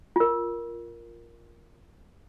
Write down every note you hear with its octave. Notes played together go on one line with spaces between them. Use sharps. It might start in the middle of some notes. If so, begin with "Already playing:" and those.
F4 A#4